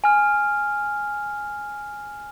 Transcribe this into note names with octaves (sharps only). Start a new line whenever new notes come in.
G#5 F6